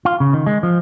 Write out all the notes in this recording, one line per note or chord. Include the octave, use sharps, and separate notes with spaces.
F4
C#3
D#3
G#3
F3